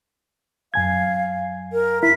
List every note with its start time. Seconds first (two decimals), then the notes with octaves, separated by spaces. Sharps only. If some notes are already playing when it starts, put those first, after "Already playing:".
0.74 F#2 F5 G#5 G#6
1.73 A#4
2.03 E4 B6